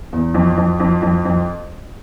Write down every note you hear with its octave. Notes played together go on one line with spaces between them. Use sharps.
E2
F2
F2
F2
F2
F2